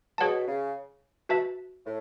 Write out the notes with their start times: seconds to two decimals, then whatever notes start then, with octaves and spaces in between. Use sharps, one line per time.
0.18 B2 G#4 C#5 F#5 A5
0.47 C#3
1.29 F#4 B4 E5 A5
1.85 A2